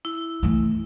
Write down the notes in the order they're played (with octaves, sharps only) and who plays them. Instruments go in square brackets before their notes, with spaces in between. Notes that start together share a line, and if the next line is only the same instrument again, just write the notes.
[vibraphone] E4
[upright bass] E3 A3